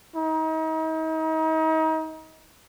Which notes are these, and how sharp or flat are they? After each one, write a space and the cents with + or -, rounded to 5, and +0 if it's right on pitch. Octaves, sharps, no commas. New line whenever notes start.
D#4 +35